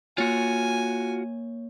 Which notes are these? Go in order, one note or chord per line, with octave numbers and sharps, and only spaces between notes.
A#3 F4 F#4 C#5 G#5